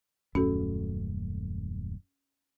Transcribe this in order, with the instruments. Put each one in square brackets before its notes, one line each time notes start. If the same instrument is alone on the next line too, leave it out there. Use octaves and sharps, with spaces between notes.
[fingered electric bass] D#1 F#2 A3 [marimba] C#4 F#4 A4